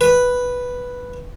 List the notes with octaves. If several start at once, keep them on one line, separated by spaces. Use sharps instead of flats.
B4